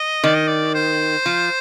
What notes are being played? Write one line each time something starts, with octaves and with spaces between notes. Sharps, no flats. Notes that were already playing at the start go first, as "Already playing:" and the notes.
Already playing: D#5
D#3 D5
D#5
D5
C5
F3